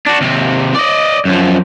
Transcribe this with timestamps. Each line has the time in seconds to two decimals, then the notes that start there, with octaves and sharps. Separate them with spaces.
0.07 D4 F#4
0.21 D#2 C3
0.75 D5 D#5
1.25 F#2 F3